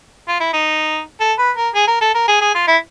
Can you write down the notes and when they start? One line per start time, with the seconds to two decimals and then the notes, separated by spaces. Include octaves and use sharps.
0.28 F4
0.40 E4
0.53 D#4
1.20 A4
1.38 B4
1.57 A#4
1.75 G#4
1.87 A#4
2.01 A4
2.14 A#4
2.28 G#4
2.41 G#4
2.55 F4
2.67 E4